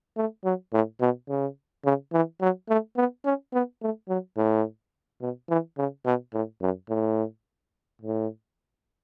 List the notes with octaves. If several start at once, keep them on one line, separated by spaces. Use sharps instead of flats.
A3
F#3
A2
B2
C#3
C#3
E3
F#3
A3
B3
C#4
B3
A3
F#3
A2
B2
E3
C#3
B2
A2
F#2
A2
A2